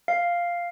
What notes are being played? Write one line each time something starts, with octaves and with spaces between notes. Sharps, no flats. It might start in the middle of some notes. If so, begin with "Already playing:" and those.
F5